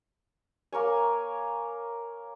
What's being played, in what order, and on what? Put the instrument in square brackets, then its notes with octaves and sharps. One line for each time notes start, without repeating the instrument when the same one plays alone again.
[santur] A#3 A#4 C#5 G#5